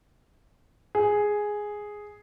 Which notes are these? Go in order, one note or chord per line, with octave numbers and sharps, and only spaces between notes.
G#4